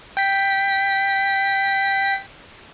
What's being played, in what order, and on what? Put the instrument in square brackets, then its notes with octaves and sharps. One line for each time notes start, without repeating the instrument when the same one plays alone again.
[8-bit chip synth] G5 B6